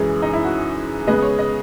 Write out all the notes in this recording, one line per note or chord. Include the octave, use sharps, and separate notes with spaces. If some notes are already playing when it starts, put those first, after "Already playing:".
Already playing: F#2 E3 G#3 G#4
D#4
E4
F#4
C#3 G#3 B3 D#5
C#5
D#5